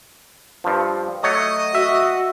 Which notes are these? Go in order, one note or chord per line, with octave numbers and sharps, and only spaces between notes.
G2 F3
F#3 A3 C#5 D#5 D#6
F#4 E5